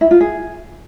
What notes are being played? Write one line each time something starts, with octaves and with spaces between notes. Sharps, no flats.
E4
F4
G#4